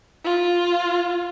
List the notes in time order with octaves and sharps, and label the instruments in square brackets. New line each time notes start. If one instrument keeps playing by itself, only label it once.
[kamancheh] F4